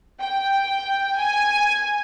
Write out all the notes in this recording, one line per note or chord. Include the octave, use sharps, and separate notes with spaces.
G5
G#5